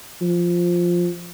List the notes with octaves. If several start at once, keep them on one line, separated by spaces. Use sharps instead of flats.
F3